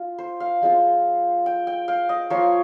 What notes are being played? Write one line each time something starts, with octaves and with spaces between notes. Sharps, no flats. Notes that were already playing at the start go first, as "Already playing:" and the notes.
Already playing: F4
C5
F5
F3 G#3 C4 F4
G5
G5
F5
D#5
F3 A#3 F4 C#5